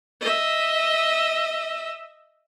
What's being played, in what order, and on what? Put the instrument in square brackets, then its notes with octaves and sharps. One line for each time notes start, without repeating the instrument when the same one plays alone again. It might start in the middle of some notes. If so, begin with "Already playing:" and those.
[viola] D#5 E5